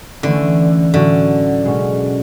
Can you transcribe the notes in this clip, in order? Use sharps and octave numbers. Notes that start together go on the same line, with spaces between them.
D3 E3 A3 C#4 E4
A2 D3 F#3 C#4 F#4
B2 G#3 C#4